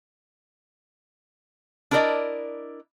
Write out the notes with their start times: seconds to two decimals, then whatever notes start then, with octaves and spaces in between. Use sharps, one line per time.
1.91 D4 E4 A#4 B4 D5 D#5